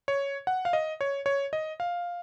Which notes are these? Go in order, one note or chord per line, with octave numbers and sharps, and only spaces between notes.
C#5
F#5
F5
D#5
C#5
C#5
D#5
F5